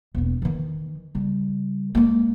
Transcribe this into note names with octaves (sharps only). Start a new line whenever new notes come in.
E1 A#3
D#3 E3
C#3 G3
G#3 A#3